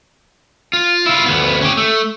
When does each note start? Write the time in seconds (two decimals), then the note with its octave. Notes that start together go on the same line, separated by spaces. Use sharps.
0.73 F4
1.06 E4 F4
1.26 D2 B3
1.61 C#4 G4
1.77 A3